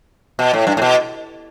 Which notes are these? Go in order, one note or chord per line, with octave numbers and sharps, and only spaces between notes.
B2
A2
G2
A2
B2